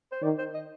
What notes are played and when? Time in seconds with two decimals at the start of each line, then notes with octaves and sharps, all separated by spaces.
0.12 C5
0.22 D#3 D5
0.39 C5
0.54 D#5